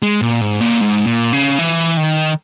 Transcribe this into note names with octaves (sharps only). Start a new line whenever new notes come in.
G#3
A#2
G#2
A#2
G#2
A#2
C#3
E3
D#3